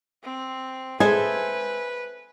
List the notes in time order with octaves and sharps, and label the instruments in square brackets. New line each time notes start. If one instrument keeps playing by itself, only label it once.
[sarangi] C4
[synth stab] G#3 [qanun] A4 C5 E5 [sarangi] B4 [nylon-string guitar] G#5